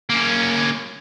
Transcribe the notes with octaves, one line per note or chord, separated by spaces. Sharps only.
A#3 C#4